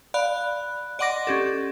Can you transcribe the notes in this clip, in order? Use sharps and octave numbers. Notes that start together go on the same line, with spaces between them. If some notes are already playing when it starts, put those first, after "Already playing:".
D5 F5 B5 F#6
D5 D#5 F#5 C6 D6 A#6
C#4 G4 A4